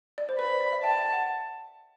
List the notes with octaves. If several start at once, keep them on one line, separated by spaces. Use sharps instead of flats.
D5
C5
B4 B5
D5
D5
E5
E5 G5 A5
E5 G5
F#5